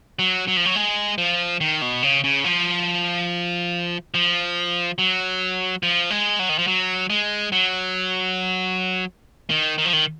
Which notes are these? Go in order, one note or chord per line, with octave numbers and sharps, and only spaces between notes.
F#3
F#3
F3
F#3
G#3
F3
D#3
B2
C#3
C#3
F3
F3
F#3
F3
G#3
F#3
D#3
F3
F#3
G#3
F#3
D#3
D#3
F3
D#3